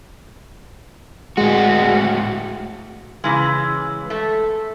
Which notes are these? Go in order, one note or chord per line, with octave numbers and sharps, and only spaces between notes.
A2 G#3 F#4
C#3 E3 G#3
A3